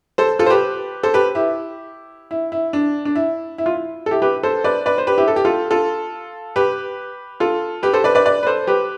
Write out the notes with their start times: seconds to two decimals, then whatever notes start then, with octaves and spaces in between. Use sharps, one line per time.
0.18 A4 C5
0.39 F4 A4
0.46 C5
0.50 G4 B4
1.03 A4 C5
1.14 G4 B4
1.35 E4 G4
2.31 E4
2.52 E4
2.73 D4
3.05 D4
3.15 E4
3.58 E4
3.66 F4
3.74 E4
4.06 A4
4.11 E4 G4
4.22 G4 B4
4.43 A4 C5
4.64 B4 D5
4.86 B4 D5
4.98 C5
5.07 G4 B4
5.18 E4 G4
5.28 A4
5.36 G4
5.45 F4 A4
5.71 F4 A4
6.56 G4 B4
7.40 F4 A4
7.83 G4 B4
7.93 A4 C5
8.04 B4 D5
8.15 B4 D5
8.25 B4 D5
8.43 B4
8.47 A4 C5
8.67 G4 B4